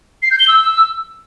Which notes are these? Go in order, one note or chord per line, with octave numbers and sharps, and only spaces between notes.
C7
G6
G7
E6